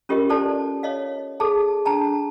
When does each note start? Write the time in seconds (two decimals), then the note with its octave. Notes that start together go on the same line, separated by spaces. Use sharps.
0.09 C#4 F4 G4 A#4 D#5
0.30 A4 C5 D5 A5
0.83 C#5 D#5 F5
1.40 G#4 A4 A5
1.85 D4 A5 A#5